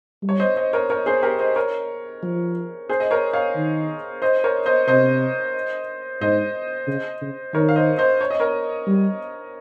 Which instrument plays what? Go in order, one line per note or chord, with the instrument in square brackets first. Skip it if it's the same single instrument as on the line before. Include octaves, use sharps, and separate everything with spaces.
[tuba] G3
[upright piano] C#5
C5 D#5
C5 D#5
A#4 C#5
A#4 C#5
G#4 C5
G4 A#4
C5 D#5
A#4 C#5
[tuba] F3
[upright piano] G#4 C5
D#5
A#4 C#5
C#5 F5
[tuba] D#3
[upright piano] C5 D#5
A#4 C#5
C5 D#5
[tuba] C3 [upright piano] C5 D#5
[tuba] G#2 [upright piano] C5 D#5
[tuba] C#3
C#3
[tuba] D#3 [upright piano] A#4 C#5
[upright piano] F5
C5 D#5
C5 D#5
C#5
D#5
A#4 C#5
[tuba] G3